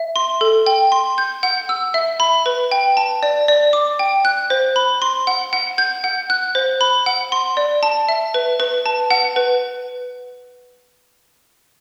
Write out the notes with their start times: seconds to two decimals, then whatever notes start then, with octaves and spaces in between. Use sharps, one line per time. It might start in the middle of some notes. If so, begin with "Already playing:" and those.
Already playing: E5
0.16 C6
0.41 A4
0.66 G5
0.92 C6
1.18 G6
1.43 F#5
1.69 E6
1.94 E5
2.20 B5
2.46 B4
2.71 G5
2.97 A5
3.23 D5
3.48 D5
3.73 D6
3.99 G5
4.25 F#6
4.50 C5
4.76 B5
5.02 C6
5.27 F#5
5.53 F#5
5.78 G6
6.04 F#5
6.30 F#6
6.55 C5
6.81 B5
7.06 F#5
7.32 C6
7.57 D5
7.83 A5
8.09 E5
8.34 B4
8.60 B4
8.86 A5
9.10 F#5
9.36 B4